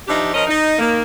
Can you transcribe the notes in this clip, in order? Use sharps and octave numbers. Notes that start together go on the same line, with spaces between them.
F3 D4 D#4 G4 E5
F3 C#4 A#4 D#5
D#4
D#3 A#3